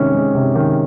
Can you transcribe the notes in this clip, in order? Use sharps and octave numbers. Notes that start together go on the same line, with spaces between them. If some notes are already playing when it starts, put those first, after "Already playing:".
Already playing: C3 D#3 G#3 C#4
G#3
C3
D#3